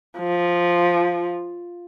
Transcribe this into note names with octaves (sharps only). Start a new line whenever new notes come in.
F3